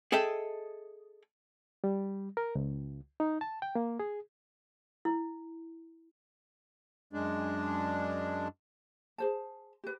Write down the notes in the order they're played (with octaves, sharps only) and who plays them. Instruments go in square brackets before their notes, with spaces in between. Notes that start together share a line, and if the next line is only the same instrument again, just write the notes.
[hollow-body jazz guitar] G#4 A4 D#5 E5 G5
[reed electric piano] G3
A#4
C#2
D#4
A5
G5
A#3
G#4
[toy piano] E4
[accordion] F#2 G#3 D4
[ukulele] G#4 C5 A5
G4 B4